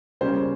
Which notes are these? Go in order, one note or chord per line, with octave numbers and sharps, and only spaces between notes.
C#3 G3 A#3 C#4 C5